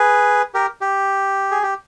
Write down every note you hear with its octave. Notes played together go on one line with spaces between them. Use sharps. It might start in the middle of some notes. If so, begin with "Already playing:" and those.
Already playing: G#4 B4
G4 A#4
G4
G#4
G4